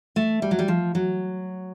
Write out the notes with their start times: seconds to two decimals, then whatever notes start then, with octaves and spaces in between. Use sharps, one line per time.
0.16 A3
0.42 G3
0.51 F#3
0.59 G3
0.68 F3
0.95 F#3